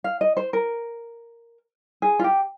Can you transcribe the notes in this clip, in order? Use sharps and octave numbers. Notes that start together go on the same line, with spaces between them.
F5
D#5
C5
A#4
G#4
F4
G4